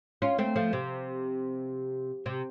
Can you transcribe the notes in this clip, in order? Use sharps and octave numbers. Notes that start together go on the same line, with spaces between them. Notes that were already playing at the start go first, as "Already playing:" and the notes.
C#4 F4
A3 C4
F3 A3
C3
C3